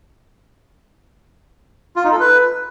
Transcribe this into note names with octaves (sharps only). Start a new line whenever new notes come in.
F4
D#4
A4
B4